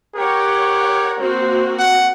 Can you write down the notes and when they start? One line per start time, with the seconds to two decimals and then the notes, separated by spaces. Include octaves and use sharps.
0.16 G4 A#4 C#5 F#5
1.20 A#3 C4 F#4 C5
1.79 F#5